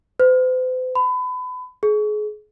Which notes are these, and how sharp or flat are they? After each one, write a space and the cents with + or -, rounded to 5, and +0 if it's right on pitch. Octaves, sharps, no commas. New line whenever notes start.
C5 -45
B5 +30
G#4 +30